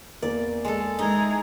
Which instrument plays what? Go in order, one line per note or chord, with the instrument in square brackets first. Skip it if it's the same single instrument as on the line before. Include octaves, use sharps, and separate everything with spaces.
[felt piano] E2 A#3 A#4 [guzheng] D5
[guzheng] G#3 A4
[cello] E3 G#3 [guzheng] D#4 [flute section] G#4 A#5